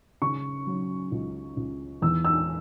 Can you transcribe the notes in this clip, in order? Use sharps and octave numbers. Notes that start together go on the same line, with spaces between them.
C#3 C#6
F#3
C#2
C#2
E2 E6
E6